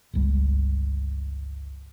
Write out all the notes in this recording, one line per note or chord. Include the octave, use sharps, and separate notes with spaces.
G1 C#2 G3